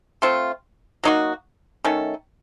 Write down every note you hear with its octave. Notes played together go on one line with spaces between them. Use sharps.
A3 C4 F4
F#3 A#3 D#4 F#4
D#3 A3 C#4 A4